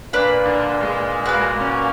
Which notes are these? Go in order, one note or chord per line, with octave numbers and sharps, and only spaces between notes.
A#2 A#3 D4 B4 D5
D3
G#3
F#4 B4 F5
C#4